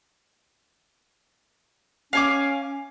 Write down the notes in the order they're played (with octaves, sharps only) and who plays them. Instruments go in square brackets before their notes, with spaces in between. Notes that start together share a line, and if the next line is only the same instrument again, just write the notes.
[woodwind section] C#4 [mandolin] F5 G#5 D6